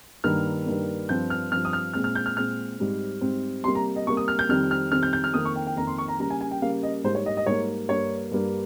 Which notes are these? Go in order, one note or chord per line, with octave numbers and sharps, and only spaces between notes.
G2 D#3 A#3 F6
G2 D#3 A#3
G2 F3 C4 G6
F6
G2 F3 C4 F6
D#6
F6
A#2 G#3 C4 F6
F6
G6
F6
A#2 G#3 C4 F6
G#2 G3 C4
G#2 G3 C4
C3 G3 A#3 C6
A#5
D#5
C3 G3 A#3 C#6
D#6
F6
G6
F2 D#3 G3 C4 F6
F6
F2 D#3 G3 C4 F6
G6
G6
F6
F2 D#3 A#3 D#6
C#6
G5
G5
F2 D#3 A#3 A#5
C6
C#6
A#5
C#3 G3 A#3 A#5
G#5
G#5
G5
C#3 G3 A#3 F5
D#5
G#2 G3 A#3 C5
C#5
D#5
D#5
G#2 G3 A#3 C#5
G2 G3 A#3 C#5
G2 G3 A#3